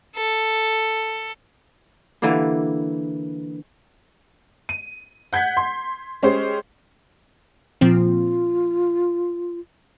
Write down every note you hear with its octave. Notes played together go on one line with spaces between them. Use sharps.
A4
D3 E3 G3 A#3
D#7
F#5 G6 G#6 B6
C6
G#3 C#4 G4 C5
A#2 F3 C4 F4